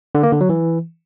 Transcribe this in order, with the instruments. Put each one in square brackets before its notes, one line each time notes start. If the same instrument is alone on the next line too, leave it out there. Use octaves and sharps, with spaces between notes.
[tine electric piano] D3
A#3
D3
F#3
E3